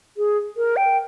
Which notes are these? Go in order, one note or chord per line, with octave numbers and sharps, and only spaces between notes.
G#4
A#4
G5